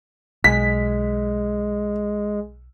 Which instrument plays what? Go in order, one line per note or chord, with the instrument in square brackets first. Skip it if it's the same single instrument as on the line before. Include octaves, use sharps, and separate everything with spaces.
[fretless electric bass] B1 [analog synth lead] G#3 [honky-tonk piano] B6